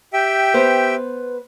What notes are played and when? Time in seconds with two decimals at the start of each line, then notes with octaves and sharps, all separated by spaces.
0.13 G4 E5 G5
0.54 B3 B4 C5